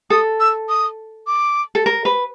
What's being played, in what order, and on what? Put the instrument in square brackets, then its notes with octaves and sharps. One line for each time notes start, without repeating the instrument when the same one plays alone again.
[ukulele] A4 [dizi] D#6
[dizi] E6
D#6
D6
[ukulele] A4
A#4
B4